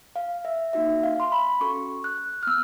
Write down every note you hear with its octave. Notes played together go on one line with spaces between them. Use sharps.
F5
E5
A#3 D#4 F#4 E5
F5
C6
B5
C#4 F#4 A4 C#6
F#6
F6
B3 E6